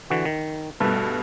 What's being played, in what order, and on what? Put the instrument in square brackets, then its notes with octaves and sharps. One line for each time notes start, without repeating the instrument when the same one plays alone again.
[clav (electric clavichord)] D3 E3 F#4
D#3
[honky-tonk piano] G2 B2 [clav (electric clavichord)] A3 A4 B4